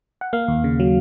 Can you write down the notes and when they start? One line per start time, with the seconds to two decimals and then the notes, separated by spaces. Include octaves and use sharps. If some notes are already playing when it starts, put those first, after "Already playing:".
0.21 F#5
0.33 A#3 F5
0.48 D#2
0.64 C#3
0.80 F#3